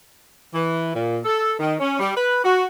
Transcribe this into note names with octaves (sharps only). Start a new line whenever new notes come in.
E3
A#2
A4
D#3
C#4
G3
B4
F#4